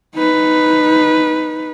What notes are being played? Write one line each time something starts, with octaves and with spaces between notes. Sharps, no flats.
D#4 B4